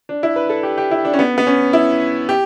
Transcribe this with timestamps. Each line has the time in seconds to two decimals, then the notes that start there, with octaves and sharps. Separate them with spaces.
0.09 D4
0.23 E4
0.36 B4
0.49 A4
0.63 G4
0.78 G4
0.91 E4
1.05 D4
1.14 C#4
1.19 B3
1.38 B3
1.47 C#4
1.73 E4
2.29 G4